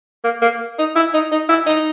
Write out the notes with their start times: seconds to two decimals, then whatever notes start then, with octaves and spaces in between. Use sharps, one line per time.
0.24 A#3
0.42 A#3
0.79 D#4
0.96 E4
1.14 D#4
1.31 D#4
1.49 E4
1.67 D#4